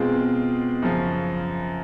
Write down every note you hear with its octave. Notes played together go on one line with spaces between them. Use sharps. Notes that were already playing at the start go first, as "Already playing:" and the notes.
Already playing: B2 G#3 C4 F4
F#2 C#3 F3